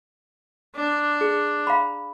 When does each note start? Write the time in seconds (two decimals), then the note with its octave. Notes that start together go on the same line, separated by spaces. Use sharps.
0.76 D4
1.21 G#4
1.67 F5 A#5 B5